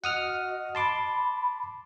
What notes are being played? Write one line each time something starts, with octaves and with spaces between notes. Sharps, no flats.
F#4 D#5 F#5 D#6 F6
A5 B5 C6 D6